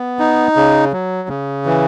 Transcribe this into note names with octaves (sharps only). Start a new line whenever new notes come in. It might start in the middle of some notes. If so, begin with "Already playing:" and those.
Already playing: B3
D#4
C#3
F#3
C#3
E3